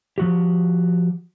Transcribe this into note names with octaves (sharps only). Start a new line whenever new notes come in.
F3 F#4 G4